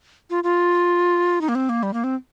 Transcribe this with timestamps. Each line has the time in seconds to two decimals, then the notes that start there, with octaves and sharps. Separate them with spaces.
0.30 F4
0.44 F4
1.41 D#4
1.49 A#3
1.55 C4
1.69 A#3
1.83 G3
1.93 A#3
2.04 C4